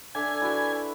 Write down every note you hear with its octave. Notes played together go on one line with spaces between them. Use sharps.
D3 E5 G#5 D6
E4 F#4 B4